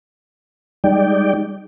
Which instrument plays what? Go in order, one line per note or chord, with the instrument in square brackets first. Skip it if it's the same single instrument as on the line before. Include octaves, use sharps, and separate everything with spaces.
[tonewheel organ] G3 G#3 D#4 D5 G5